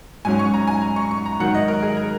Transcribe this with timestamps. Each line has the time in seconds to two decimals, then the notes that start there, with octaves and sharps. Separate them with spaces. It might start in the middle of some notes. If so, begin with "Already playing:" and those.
0.25 G#2 F#3 C#4 G#5
0.39 C#6
0.54 A#5
0.67 G#5
0.81 A#5
0.96 C#6
1.11 C#6
1.26 A#5
1.40 G#2 D#3 F#3 F#5
1.54 D#5
1.68 A#4
1.83 G#4
1.97 A#4